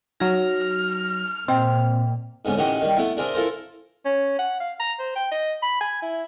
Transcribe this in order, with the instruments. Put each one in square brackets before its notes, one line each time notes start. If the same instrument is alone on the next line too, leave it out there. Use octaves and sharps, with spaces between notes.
[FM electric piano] F#3 A#6 [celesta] D#4 [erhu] F6
[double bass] A#2 [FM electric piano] C4 [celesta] D#5 G5
[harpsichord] G#2 D3 B3 C#4
A1 D#3 G4 G#4 F#5
D#3 G3
A3 B3 E4
D4 G#4 A#4 C5 E5
E4 F4 A4 A#4 C5
[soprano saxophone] C#4
F#5
F5
A#5
C5
G5
D#5
B5
G#5
E4